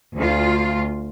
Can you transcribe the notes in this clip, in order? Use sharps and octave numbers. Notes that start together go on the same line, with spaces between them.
D2 F4